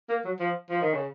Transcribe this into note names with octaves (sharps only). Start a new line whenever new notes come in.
A#3
F#3
F3
F3
D#3
C#3